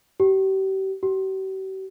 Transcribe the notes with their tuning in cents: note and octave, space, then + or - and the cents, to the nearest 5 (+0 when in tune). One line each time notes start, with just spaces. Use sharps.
G4 -35
G4 -45